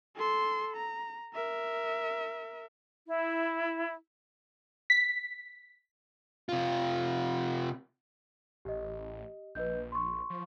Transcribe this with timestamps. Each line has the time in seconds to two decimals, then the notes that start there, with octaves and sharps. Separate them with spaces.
0.16 A4 C6
0.77 A#5
1.34 A#4 E5
3.07 E4
4.90 B6
6.49 C3 F4
8.65 A1 G4 D#5
9.55 A#1 B4 D#5 G6
9.92 C6 C#6
10.30 F3